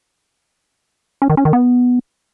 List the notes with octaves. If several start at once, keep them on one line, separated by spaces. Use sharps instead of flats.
C#4
D#3
C#4
D#3
B3